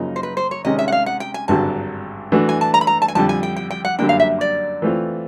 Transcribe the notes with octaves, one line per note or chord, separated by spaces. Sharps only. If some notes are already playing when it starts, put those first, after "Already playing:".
Already playing: F#2 C#3 F3 A#3 D#4
C5
B4
C5
C#5
C3 D#3 G#3 C#4 D#5
E5
F#5
F5
F#5
G5
G#5
G#1 G2 D3 F#3 A5
E3 A3 D4 F#4
G#5
A5
A#5
B5
A#5
A5
G#5
F2 D3 G3 A5
G#5
G5
G5
G5
F#5
F#2 D3 G3 A#3 D4 G5
F5
E5
D5
E3 A3 C4 F4